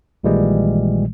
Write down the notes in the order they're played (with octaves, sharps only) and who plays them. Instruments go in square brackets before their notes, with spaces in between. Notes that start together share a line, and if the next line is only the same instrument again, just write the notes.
[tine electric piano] A#1 A#2 D#3 E3 G3 G#3